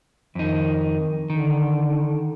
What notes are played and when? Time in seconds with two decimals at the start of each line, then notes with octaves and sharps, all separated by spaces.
0.35 F2 D#3 D#4
1.30 D3 D#3